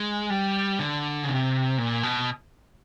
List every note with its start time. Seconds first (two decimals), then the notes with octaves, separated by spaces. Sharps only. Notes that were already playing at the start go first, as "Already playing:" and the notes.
Already playing: G#3
0.30 G3
0.79 D3
1.23 C#3
1.29 C3
1.78 A#2
2.03 B2